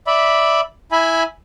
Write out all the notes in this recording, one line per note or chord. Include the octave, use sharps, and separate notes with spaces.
D5 E5 B5
E4 E5 G#5 B5